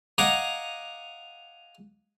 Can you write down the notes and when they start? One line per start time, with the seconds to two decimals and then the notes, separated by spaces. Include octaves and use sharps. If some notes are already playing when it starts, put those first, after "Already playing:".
0.18 D#5 F5 F#5 G#5 A#5 D6